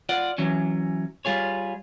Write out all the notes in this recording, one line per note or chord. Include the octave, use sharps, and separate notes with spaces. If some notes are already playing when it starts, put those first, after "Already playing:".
F4 D5 F#5
E3 F#3 C#4
G3 F4 G#4 C#5